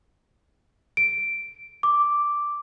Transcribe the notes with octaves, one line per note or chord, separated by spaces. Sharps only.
D7
D6